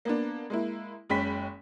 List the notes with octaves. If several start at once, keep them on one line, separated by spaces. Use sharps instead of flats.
A#3 B3 D4
G#3 A#3 E4
F#1 G#3 C#4 G5 B5 B6